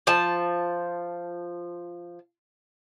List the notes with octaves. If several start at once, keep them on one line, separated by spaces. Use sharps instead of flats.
F3 A5